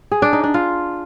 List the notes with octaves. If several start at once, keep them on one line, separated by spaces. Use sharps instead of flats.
G#4
D4
D#4
D4
F4